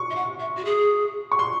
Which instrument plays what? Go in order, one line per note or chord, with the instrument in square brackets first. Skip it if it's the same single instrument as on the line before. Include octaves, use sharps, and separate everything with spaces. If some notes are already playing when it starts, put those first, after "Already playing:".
Already playing: [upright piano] C#6
[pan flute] E5
F#5
E5
F#4
G#4
[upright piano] C#6
C6